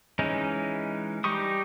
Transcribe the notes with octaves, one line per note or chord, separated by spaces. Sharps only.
E3 G#3 C#4 D#4
G3 D#4 G4 C#6 D#6